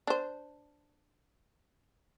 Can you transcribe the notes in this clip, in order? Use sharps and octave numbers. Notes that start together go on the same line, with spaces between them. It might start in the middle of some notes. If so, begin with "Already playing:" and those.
D4 C5